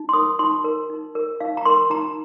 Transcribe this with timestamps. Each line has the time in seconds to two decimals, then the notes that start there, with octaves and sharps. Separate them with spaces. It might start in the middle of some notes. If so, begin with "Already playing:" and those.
Already playing: D#4
0.09 C6
0.13 A#4 D#6
0.39 D#4 C6
0.64 A#4
0.90 D#4
1.15 A#4
1.40 D#4 F5
1.57 A#5
1.65 A#4 C6
1.90 D#4 A#5